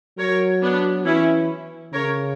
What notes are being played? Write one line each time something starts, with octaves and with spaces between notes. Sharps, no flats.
F#3 A#4 C#5
B3 D4
E3 C#4 E4
C#3 A#4 C#5